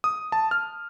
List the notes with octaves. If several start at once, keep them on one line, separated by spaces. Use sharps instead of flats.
D#6
A5
F6